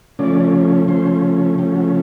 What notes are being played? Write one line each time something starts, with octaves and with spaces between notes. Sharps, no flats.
C#3 F3 A3 C#4 D5
C#3 F3 A3 C#4 C5
C#3 F3 A3 C#4 G4
F#4